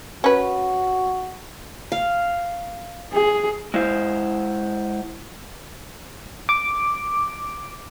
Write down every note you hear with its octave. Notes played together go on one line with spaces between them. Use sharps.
C#4 F#4 B4
F5
G#4
G#3 E4 C5 F5
D6